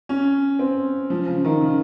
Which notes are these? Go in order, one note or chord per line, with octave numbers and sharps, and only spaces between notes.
C#4
C4
F3
C#3
D#3
C#3